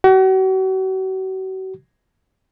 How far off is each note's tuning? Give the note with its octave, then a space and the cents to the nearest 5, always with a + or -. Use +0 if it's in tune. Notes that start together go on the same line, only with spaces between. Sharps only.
F#4 +40